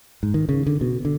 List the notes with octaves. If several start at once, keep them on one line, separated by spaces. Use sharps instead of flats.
G#2
D#3
C#3
D3
B2
D3